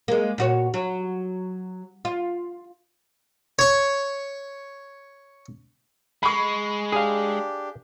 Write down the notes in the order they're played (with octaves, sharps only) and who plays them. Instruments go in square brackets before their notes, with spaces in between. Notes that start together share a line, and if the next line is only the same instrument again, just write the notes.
[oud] G#3 A#3
A#2 F#4 C#5
F#3
F4
[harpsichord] C#5 C#6
[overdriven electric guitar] G#3 [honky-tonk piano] B5 C#6
[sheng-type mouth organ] D4 G4 [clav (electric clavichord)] G#4 F5